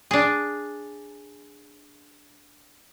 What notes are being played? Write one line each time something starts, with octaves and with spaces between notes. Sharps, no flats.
D4 G#4